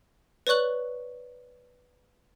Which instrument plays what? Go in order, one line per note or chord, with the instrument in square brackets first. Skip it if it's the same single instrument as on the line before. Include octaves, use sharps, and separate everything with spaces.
[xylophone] B4 C#5 D5 C#6 F#6 F#7